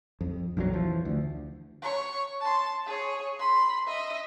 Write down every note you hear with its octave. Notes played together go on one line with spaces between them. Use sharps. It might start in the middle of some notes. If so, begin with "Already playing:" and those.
F2
A#1 F2 F3 F#3
E3 F3
D2
C#5 C#6
A5 C6
G#4 C#5
B5 C6
D#5 E5